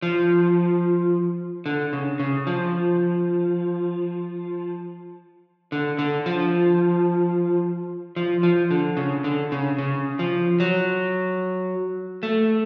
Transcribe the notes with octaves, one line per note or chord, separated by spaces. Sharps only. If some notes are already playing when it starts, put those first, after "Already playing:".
F3
D3
C#3
C#3
F3
D3
D3
F3
F3
F3
D3
C#3
D3
C#3
C#3
F3
F#3
A3